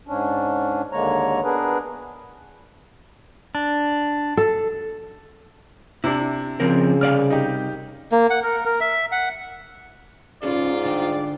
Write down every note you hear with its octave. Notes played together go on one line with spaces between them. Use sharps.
G#2 C#4 D4
D#2 D3 G#3 A#3 C#5 A#5
B3 D4 G#4 A#4 B4
D4
A4
C3 D4 E4
C#3 F3 C4 A#4
C2 D5 F5 F6
D#4 G4
A#3
F#5
A#4
A#4
E5
F#5
G#2 C#4 F4 G#4 A4 D5
D3 D4 G5